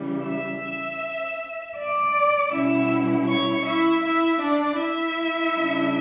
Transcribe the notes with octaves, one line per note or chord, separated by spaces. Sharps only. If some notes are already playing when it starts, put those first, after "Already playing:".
Already playing: C#3 E3 G3
E5 E6
D5 D6
B2 G3 C#4 E4 E5 E6
C#5 C#6
E4 E5
E4 E5
D4 D5
E4 E5
C#3 G3 D4